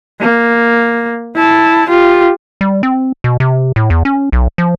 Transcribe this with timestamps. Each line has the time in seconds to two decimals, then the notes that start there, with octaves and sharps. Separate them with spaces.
0.21 A#3
1.36 E4 A5
1.89 F4 G4
2.61 G3
2.83 C4
3.24 B2
3.40 C3
3.76 A2
3.90 E2
4.05 C#4
4.32 B1
4.58 F3